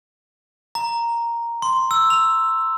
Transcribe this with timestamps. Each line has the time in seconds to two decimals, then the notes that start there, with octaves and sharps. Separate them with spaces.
0.75 A#5
1.62 C6
1.91 E6
2.10 F7